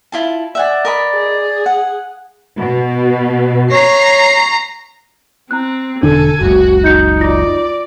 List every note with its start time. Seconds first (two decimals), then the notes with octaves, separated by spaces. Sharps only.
0.12 E4 F4 A5
0.55 D5 E5 F#5 G#5
0.85 A#4 D#5 B5
1.15 G#4
1.66 F#5
2.58 B2
3.72 C#5 A#5 C7
5.51 C4 A#5 F#6
6.03 E1 D3 D4 A4 G#5
6.41 F#1 C#2 F#4
6.84 D#4 G6 C#7
7.21 F4 D5 A#6